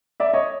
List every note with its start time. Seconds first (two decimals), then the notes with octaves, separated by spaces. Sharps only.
0.20 D5 E5
0.33 C#5 D#5